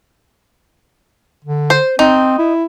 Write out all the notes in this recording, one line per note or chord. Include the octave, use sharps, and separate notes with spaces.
D3
C5
C4 D#4
E4